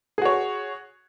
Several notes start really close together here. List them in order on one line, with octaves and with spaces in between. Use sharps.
G#4 F#4 C#5